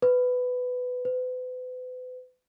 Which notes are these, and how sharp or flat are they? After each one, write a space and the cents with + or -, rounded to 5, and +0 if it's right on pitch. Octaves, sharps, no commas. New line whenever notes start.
B4 +15
B4 +40